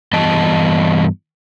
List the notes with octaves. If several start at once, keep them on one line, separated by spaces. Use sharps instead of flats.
G2 E3 B3 D#5 A5